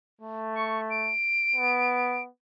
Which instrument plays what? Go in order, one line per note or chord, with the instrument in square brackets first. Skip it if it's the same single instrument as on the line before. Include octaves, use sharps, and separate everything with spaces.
[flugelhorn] A3
[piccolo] C#6
D7
[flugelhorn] B3